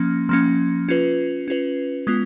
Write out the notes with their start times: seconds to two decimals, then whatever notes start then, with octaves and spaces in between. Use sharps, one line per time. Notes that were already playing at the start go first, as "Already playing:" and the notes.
Already playing: F3 A#3 C#4
0.29 F3 A#3 C#4
0.89 C#4 F4 B4
1.48 C#4 F4 B4
2.07 G#3 B3 F4